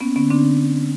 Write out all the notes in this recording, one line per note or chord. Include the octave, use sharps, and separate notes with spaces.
A#3 B3 C#4
D3 B3 C#4
D3 C4 D4